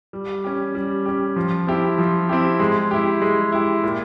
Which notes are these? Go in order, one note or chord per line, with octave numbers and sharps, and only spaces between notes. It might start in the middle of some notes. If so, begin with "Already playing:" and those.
G3
C#4 G4
G3
C#4 G4
F3
C4 E4 G4
F3
C4 E4 G4
G#3
E4 G4
G#3
E4 G4
A#2